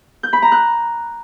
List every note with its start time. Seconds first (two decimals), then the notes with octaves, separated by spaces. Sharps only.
0.23 G6
0.33 B5
0.42 A#5
0.52 F#6